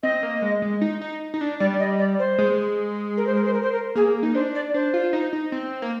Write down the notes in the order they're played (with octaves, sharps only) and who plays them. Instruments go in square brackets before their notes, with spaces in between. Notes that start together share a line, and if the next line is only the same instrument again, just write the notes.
[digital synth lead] C4 [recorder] D#5
[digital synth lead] A#3
G#3
G#3
D#4
D#4
D#4
D4
[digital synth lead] G3 [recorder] D5
[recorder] D#5
D5
C5
[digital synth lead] G#3
[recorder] A#4
C5
A#4
C5
A#4
C5
A#4
[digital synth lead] A#3 [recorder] G#4
[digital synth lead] D#4
[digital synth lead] D4 [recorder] C5
[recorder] D5
[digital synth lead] D4 [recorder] C5
[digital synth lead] F4
D#4
D#4
C4
A#3